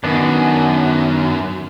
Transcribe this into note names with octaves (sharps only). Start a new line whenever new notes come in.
F#2 D#3 B3 D4